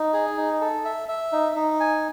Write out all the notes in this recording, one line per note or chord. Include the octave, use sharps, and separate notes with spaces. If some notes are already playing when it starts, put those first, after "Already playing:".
Already playing: D#4
G#4
D#4
A4
E5
E5
D#4
D#4
G#5